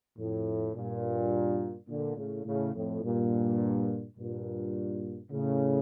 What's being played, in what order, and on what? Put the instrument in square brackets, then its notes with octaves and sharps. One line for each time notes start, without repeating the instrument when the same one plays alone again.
[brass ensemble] F2 A2
G2 A#2
A#2 D3
A2 C#3
A2 C#3
F2 A2
G2 A#2
G2 A#2
A2 C#3